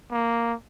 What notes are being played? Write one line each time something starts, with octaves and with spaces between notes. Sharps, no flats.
A#3